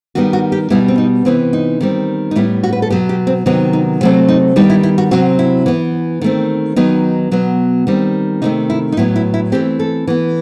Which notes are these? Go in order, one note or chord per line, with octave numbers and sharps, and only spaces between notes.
D#3 G3 B3 F#4
F#4
G4
B2 G3 B3 E4
C4
D#4
C3 E3 B3 C4
D#4
D#3 G3 C4
D#4
A2 G3 B3 E4
F#4
B4
A4
B2 F#3 B3 G4
G4
C4
C3 D#3 F#3 B3 D#4
D#4
C3 F#3 A3 C4
D#4
D#3 G3 B3 D#4
E4
E4
F#4
C3 F#3 C4 F#4
E4
E3 B3
D#3 A3 C4
D#3 F#3 B3 D#4
B2 F#3 B3
D#3 G3 C4
C3 D#3 A3 D#4
E4
D#4
A2 F#3 B3 E4
E4
E4
E3 A3 C4 G4
A4
E3 B3